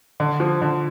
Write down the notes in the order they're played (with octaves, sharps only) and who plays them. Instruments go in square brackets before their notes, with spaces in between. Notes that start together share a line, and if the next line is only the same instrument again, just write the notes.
[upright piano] D3
F3
D3